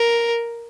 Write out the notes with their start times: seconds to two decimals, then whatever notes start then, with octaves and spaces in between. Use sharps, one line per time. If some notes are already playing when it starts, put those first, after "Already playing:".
Already playing: A#4